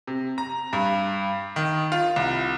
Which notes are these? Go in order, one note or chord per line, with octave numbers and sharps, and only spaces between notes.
C3
A#5
G2
D#3
F4
C2